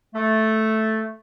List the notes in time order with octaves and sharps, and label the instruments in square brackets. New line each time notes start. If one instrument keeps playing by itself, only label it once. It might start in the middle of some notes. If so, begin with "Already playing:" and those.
[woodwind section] A3